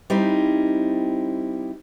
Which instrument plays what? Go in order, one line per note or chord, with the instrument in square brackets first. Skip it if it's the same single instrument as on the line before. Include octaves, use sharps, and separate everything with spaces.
[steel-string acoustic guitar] G3 C4 D#4 E4